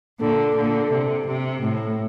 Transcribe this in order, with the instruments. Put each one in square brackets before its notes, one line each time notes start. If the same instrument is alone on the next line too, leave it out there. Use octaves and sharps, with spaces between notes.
[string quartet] A#2 D3
A#2 D3
C3
C3
A2